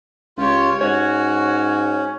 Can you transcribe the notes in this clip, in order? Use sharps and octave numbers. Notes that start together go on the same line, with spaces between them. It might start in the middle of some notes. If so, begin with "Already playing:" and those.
C#2 F4 G4 C#5
G#2 C#4 F#4 C#5